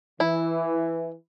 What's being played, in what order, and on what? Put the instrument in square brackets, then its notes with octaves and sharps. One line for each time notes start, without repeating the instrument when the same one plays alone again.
[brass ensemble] E3 [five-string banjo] E4